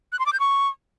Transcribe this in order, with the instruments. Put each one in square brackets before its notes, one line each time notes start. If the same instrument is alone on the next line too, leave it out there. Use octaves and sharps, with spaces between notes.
[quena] F#6
C6
D6
G6
C#6